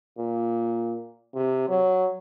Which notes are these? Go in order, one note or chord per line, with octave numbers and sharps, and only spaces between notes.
A#2
C3
F#3